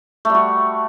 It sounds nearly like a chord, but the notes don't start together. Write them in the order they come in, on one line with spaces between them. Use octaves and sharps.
A3 G3 F#4